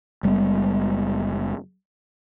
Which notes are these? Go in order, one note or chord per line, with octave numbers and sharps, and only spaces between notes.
F#1 G3 G#3 B3